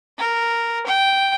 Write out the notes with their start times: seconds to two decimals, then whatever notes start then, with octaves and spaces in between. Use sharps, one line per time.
0.18 A#4
0.86 G5